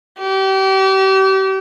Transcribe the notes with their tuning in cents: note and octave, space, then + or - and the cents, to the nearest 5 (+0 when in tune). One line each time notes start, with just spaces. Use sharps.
G4 -35